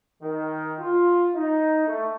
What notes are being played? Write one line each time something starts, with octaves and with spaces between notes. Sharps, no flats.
D#3
F4
D#4
A3